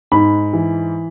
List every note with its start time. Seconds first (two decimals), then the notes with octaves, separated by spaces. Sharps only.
0.12 G#2 B5
0.53 E3